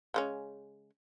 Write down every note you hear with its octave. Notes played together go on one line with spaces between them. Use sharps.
C#3 G#3 C#4